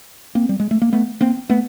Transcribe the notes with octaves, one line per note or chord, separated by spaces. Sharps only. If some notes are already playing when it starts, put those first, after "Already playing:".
A#3 C4
G3
G#3
A3
A#3
A3 B3
A#3 C4
A3 B3